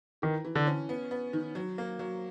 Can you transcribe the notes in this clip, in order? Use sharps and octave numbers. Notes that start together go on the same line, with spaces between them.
D#3 E3
E3
D3
C#4
B3
B3
D#3
F#3
A#3
F#3